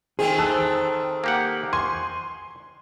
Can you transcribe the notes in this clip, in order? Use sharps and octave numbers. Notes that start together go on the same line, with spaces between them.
D#3 A3 C4 G#4
A5 E6 F#6
A#3 G4 F#5
G#5 C6